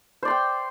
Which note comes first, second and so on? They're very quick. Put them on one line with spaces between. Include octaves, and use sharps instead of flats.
C5 D5 C6 G5